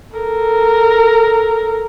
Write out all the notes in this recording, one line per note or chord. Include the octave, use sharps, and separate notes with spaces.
A4 A#4